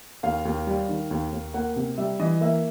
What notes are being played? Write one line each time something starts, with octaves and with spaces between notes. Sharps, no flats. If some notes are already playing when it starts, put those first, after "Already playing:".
D#2 F5
D#2
G3
D#3
D#2
D#2
A#3 F#5
C3
G3 E5
E3 D#5
A#3 E5